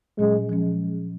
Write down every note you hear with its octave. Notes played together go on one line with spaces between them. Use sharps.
A#2 F#3 G#3 C#4
F3 G#3 C#4